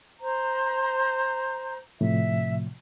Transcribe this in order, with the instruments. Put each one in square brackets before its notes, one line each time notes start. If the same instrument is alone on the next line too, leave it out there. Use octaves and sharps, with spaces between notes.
[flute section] C5 A#5
[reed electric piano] A2 C3 F3 [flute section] E5